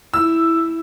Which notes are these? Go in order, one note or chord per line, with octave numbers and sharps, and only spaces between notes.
E4 E6